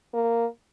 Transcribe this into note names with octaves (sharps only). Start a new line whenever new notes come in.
A#3